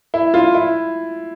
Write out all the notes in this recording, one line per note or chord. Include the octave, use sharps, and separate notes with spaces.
E4
F4
E4